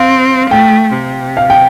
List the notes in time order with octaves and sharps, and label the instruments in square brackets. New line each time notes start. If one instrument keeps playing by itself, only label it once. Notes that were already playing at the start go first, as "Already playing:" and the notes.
Already playing: [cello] C4 [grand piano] F5
[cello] A3 [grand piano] G5
[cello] C3
[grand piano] F5
G5